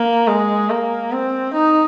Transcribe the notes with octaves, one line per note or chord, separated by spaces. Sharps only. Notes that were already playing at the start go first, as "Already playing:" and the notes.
Already playing: A#3
G#3
A#3
C4
D#4